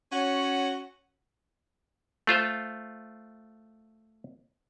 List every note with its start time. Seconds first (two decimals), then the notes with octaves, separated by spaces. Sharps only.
0.12 C#4 F#4 C#5 F#5
2.27 A3 F4 C5